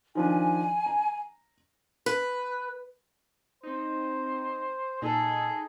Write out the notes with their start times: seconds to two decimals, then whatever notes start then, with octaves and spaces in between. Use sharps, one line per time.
0.15 D#3 F3 D4 G#5
0.86 A#5
2.06 B4
3.63 C4 D#4 C5
5.02 A#2 D#4 G#4 A4